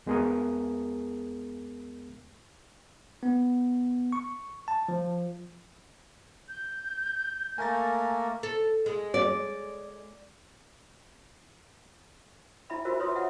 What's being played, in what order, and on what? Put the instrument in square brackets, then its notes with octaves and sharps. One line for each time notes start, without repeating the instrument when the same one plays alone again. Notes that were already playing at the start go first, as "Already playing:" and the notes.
[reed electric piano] E2 G#3 B3 G#4 A#4 D#6
[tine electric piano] B3
C#6
A5
F3
[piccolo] G6
[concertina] A3 A#3 A#4 [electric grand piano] G#5 A#5 A6
[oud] A4
G#3
[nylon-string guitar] D5
[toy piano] E4 E5 B5
F4 F#4 A#4 C5 E5
F4 B4 C#5 E5 C6 D#6
E5 F#5